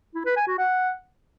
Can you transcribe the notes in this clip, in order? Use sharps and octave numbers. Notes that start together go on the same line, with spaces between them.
E4
B4
G#5
F#4
F#5